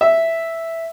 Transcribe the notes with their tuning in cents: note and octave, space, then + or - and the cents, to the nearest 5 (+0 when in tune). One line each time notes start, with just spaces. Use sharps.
E5 +0